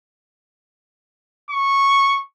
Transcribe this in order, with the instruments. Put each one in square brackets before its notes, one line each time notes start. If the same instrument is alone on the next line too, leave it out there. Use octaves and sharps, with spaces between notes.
[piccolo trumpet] C#6